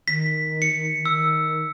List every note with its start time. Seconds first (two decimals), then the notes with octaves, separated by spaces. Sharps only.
0.08 D#3 B6
0.62 C#7
1.06 D#3 E6